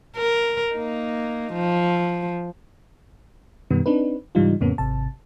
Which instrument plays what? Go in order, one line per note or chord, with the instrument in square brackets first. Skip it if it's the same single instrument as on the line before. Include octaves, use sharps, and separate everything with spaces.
[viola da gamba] A#4
A#3 D#4
F3
[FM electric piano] F#2 B2 D#3 G3 B3
C4 D4 D#4 B4
G#2 C#3 E3 G3 D#4 F4
F2 A2 C#3 A#3 B3 C#4
G#1 C3 A5